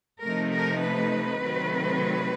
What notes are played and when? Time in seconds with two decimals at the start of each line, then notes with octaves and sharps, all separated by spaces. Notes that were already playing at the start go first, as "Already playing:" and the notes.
0.23 C3 F3 A3 C4 D#4 A#4
0.52 A#4
0.81 B4
1.40 C3 D#3 F#3 A3 C4